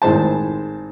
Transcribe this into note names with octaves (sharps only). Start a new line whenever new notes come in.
G#1 A2 G#3 C5 A5